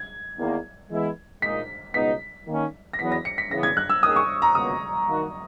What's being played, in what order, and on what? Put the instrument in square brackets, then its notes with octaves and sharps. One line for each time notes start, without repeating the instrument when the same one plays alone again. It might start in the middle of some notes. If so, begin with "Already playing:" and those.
Already playing: [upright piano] G#6
[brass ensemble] E2 D#3 A#3
E3 G#3 B3 E4
[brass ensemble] A#2 G#3 D#4 [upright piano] B6
[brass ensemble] C#2 B2 G#3 B3 D#4 [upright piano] B6
[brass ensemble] D#3 A#3 C#4
[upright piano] A#6
[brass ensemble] E2 B2 F#3 B3 [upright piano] B6
[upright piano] A#6
C#7
B6
[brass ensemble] C#3 E3 B3 [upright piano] A#6
[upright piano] G#6
F#6
E6
[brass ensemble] D#2 D#3 A#3 C#4 G#4 [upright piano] D#6
[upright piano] C#6
A#5
[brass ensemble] C#2 B2 F#3 A#3 [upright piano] D#6
[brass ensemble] D#3 A#3 D#4 F#4